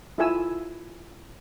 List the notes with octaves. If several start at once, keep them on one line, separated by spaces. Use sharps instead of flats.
E4 F4 A4 E5 G#5 E6